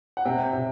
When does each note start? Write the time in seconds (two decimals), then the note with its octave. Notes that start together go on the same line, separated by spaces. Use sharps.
0.17 F#5
0.25 C3 G5
0.53 C3